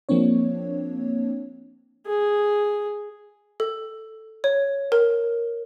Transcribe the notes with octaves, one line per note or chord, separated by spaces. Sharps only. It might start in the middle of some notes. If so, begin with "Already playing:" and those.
F3 A#3 C4 D4 C#5
G#4
A4
C#5
A#4